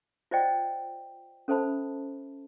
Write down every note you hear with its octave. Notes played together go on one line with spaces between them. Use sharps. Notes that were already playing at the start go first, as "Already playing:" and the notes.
F4 C5 D5 D#5 F#5 G5
C#4 A4 C5 E5 A5 B5